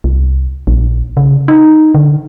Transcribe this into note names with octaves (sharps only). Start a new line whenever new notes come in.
C2
A#1
C#3
D#4
D3